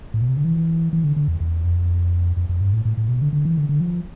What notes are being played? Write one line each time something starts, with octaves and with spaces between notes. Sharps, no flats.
A2
B2
C3
D3
E3
E3
D3
D3
E2
E2
F2
F2
F2
G2
A2
A2
A2
B2
D3
D3
E3
D3
D3
F3